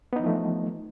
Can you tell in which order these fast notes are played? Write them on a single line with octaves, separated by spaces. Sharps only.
B3 D#4 E3 F3 A3